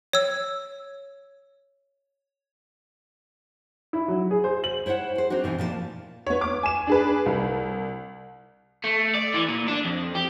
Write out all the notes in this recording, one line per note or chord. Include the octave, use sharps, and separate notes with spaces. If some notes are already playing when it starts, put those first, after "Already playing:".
C#5 E6
E4
F#3
G#4
C5
F#7
E4 C5 C#5 F5 F#5
G#4 C5
C4 D4 D#4 F#4
B2 E3 C4 D#4
A#2 F3 B4 A5
B3 C#5
D6
G#5 E7
D4 G#4 B4
C2
A3
D5
E3
A#2
D4
F2
G4